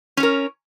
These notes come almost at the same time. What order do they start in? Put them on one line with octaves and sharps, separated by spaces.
C#4 C#5 A#4